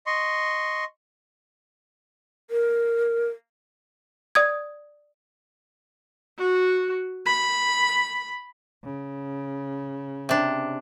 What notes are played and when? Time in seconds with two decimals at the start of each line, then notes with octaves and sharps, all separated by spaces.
0.07 D#5 C6 C#6
2.51 A#4
4.35 D5 D#6 G#6
6.38 F#4
7.26 B5
8.84 C#3
10.29 C3 D4